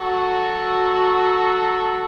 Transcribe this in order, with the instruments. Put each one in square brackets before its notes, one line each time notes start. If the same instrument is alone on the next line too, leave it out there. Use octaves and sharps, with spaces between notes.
[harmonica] F#3 F#4 A4